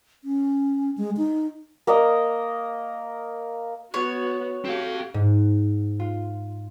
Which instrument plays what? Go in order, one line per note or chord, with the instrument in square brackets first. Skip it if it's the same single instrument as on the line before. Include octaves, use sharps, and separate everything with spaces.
[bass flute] C#4
G#3
D#4
[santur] A#3 A#4 D#5
[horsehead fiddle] B3 [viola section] F#4 [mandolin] C#5
[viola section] A3 G4 [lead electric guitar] C4 F5 [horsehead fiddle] F#4
[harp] G#2
F4